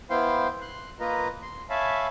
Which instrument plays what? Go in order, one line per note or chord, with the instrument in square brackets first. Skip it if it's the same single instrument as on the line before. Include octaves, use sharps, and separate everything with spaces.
[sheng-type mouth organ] B3 E4 C5 F5 G5 C6
C6 F#6
A#3 F4 A#4 B4 D#5 A#5
C6
C#5 E5 F5 G#5 A5 B5